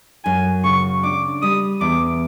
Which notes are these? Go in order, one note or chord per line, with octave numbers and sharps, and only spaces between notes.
F#2 G#5
C#3 C#6
D4 D6
G3 D#6
E2 D6